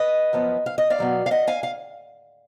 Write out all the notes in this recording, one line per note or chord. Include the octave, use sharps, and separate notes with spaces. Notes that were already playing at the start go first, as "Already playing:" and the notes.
Already playing: B4 D#5
F#2 F3 B3
F5
D#5
D5 F5
B2 F#3 B3
F5
D#5 F#5
F5 G#5
F5